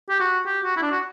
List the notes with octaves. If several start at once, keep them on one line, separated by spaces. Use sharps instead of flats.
G4
F#4
G4
F#4
E4
D4
F#4